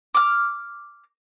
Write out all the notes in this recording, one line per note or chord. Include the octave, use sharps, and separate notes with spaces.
D6 F6